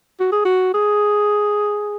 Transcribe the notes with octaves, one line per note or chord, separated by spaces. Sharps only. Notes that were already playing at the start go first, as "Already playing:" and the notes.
F#4
G#4
F#4
G#4